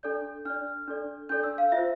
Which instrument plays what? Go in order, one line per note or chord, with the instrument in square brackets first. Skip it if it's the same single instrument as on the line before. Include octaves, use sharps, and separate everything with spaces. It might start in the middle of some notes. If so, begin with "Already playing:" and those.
[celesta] D4 A4 D5 G6
D4 A4 D5 F6
D4 A4 D5
D4 A4 D5 G6
E6
F5
F4 C5 E5